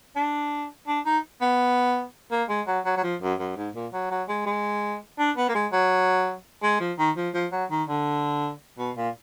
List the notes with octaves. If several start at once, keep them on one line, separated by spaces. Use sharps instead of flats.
D4
D4
D#4
B3
A#3
G#3
F#3
F#3
F#3
F3
F#2
F#2
G#2
A#2
F#3
F#3
G#3
G#3
D4
B3
A#3
G#3
F#3
G#3
F3
D#3
F3
F3
F#3
D#3
D3
B2
A#2